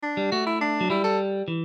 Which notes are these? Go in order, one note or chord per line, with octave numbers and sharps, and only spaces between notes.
D4
G3
A3 F#4
E4
D4
F#3
G3 E4
A4
E3